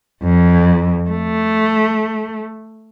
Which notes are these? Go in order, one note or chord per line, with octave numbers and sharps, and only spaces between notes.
F2
A3